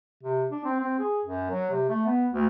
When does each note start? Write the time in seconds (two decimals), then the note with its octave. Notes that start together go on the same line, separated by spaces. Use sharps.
0.23 C3
0.51 D4
0.65 C4
0.80 C4
0.99 G#4
1.24 F#2
1.50 F#3
1.71 C3
1.89 A3
2.06 B3
2.33 D2